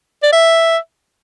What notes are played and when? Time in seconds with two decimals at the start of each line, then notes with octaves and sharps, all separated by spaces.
0.23 D5
0.32 E5